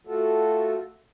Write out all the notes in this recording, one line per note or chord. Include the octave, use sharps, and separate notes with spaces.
A3 F4 F#4 A4